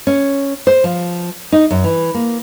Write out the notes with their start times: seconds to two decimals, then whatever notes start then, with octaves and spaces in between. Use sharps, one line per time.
0.07 C#4
0.67 C5
0.84 F3
1.52 D#4
1.71 F#2
1.84 E3
2.14 A#3